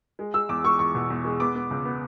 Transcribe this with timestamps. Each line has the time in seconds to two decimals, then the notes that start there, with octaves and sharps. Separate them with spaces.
0.19 G#3
0.34 G#3 E6
0.49 E2 D6
0.64 G#3 C#6
0.79 E2 C#6
0.95 B2
1.10 E2
1.25 G#3
1.40 B3 D6
1.55 B3
1.70 C#2
1.85 B3